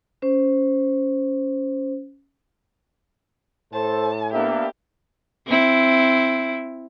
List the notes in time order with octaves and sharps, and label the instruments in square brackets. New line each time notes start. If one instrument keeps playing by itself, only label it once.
[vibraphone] C#4 C5
[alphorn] A2 [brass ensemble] A4 C5 [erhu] A5
[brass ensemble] A#3 B3 D4 [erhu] G4 [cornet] E5
[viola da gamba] C4 E4